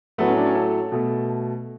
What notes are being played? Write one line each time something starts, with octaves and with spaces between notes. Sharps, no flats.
A2 F#3 A3 B3
C#4
D4
C#4
A4
B2 A3